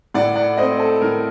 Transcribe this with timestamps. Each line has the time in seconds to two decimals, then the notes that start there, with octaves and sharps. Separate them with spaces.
0.14 A2 D5 F#5
0.36 D5 F#5
0.57 A3 C4 C5 D#5
0.80 A4
1.01 A2 A#4